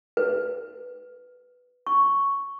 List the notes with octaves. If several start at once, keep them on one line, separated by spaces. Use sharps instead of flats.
B4
C#6